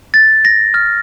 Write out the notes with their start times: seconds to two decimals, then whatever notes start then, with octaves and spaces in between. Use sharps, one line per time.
0.14 A6
0.45 A#6
0.74 F6